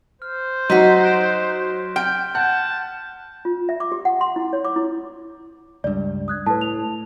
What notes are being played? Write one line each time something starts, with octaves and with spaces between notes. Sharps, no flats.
C5 F6
F#3 D#4 F#4 C6 B6
F#6 D7 E7
G5 F6 G6
F#5 A5 F#6 G6
F4
E5
D6
G4
F#5
C6
E4
C#5
D6
E4
C#2 G2 D5
D#6 F#6 G#6
A2 B4 A5
F7